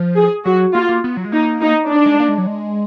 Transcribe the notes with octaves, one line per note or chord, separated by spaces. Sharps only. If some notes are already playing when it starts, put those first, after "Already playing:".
Already playing: F3
G#4
F#3 F#4
A#3 F4
A#3
B3
F#3
G#3
A#3 D#4
D#4
D4
G#3
A#3
G#3
F#3
G#3